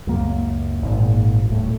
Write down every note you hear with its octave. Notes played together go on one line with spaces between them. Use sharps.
C#2 F#2 A#3
G#1 A#2
D#1 A2